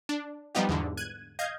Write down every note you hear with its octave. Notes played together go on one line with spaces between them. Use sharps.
D4
F3 G3 B3 D#4 F4 G4
E2 G#2 D3
F#6 G#6 D#7
D#5 F5 G6 G#6